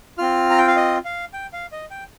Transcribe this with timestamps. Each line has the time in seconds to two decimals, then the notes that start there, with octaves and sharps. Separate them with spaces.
0.18 C4 F4 F6
0.50 A#5
0.58 G5
0.67 F5
0.76 D#5
1.05 F5
1.33 G5
1.53 F5
1.72 D#5
1.91 G5